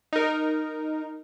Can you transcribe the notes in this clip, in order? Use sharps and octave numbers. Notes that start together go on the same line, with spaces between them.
D#4 A#4